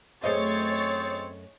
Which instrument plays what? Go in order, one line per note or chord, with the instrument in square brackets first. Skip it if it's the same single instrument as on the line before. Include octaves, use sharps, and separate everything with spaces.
[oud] F#2 A3 [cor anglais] C4 [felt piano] G#4 C5 D#5 [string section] C#5 A6